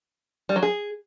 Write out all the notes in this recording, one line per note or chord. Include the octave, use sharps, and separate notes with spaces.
G3
F#3
G#4